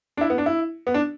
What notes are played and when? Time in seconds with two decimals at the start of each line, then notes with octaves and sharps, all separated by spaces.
0.17 D4
0.21 E4
0.30 B3
0.38 D4
0.46 E4
0.87 B3
0.94 D4